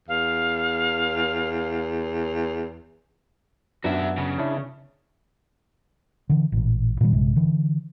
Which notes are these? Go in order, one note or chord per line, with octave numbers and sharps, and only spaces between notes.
E2 F5
F#2 B3 D4 F#4 E5
C#3
C#4 D4 E4
D3 E3
A1 A#2
A#2 D#3 G3
A#1 G2 C3 G#3
D3 E3